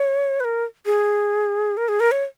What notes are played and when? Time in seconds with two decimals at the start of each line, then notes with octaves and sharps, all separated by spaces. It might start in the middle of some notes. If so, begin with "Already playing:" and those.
Already playing: C#5
0.40 B4
0.44 A#4
0.86 G#4
1.77 A#4
1.89 G#4
2.00 A#4
2.12 C#5